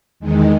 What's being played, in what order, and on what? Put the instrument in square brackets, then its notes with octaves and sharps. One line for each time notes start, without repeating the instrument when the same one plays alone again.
[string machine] E2 D#3 G#3